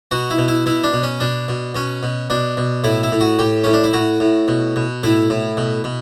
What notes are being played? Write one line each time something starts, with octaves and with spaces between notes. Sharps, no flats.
B2 F#4
E4
B2
E4
B2 E4
D4
B2
C#4
B2 D4
B2
B2 C#4
B2
B2 D4
B2
A2 E4
E4
A2
F#4
A2 G4
A2 C#4
D4
E4
A2 F#4
A2
B2
B2
A2 E4
A2
B2
B2